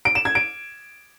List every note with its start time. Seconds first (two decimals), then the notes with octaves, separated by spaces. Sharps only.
0.05 D7
0.15 E7
0.25 G#6
0.35 D7